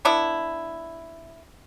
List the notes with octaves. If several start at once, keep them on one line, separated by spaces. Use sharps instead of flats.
B3 D4 E4